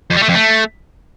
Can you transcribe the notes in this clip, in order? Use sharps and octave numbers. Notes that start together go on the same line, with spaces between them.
F2
G3
A3
F2
A3